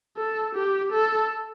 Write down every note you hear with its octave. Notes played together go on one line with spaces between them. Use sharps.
A4
G4
A4